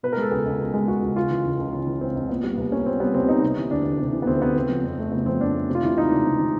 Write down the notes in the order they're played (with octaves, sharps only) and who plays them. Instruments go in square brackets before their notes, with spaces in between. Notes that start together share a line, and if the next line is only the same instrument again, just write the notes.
[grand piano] B2 B4
G#3 A#4
A4
C#2 G#4
C#2
B2
G#3
C#2 F#4
C#2
C#3 F4
E3
C#2
C#2
C#3
E3
C#2 C4
C#2
A#2 B3
G3
C2 B3
A#3 C#4
A#2 C4
G3 B3
C2 C4
A#3 D#4
C3
E3
D2 D4
D2
C3
E3
B3
D2 C4
D2 B3
C#3 C4
F3
F2
A3
C#3 B3
F3 C4
F2 D4
A3
C3
F4
E3 E4
C#2 D#4
C#2 D4
C3
E3